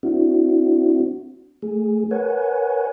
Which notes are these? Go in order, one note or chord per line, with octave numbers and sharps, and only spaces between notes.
C4 D4 E4 F#4
A3 G#4
A#4 B4 C#5 F#5 G#5